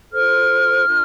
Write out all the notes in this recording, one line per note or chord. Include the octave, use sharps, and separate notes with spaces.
F4 A4 C5 F6
D4 F4 A#4